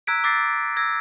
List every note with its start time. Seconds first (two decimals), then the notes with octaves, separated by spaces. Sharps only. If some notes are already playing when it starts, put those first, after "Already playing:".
0.07 A#5 E6 F#6 G#6 B6 D7
0.24 D6 E6 A6 A#6 C7
0.77 E6 G#6 A#6